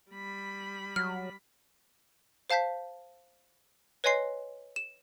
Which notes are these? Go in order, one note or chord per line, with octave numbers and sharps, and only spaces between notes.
G3 B5
F#3 F6
C5 F5 A5 G6 B6
B4 C#5 D#5 G#5 C6 C7
E7